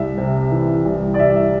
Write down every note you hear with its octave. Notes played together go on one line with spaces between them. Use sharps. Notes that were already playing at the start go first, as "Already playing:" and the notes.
Already playing: C2 E5
C3
E3
C2
D5
C2 E5
E5